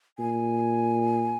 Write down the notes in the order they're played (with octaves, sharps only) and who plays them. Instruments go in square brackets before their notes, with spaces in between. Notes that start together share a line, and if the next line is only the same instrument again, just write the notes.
[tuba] A#2 [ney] G#5